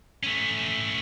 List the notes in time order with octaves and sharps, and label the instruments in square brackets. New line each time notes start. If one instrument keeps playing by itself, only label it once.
[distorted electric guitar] A3 C#4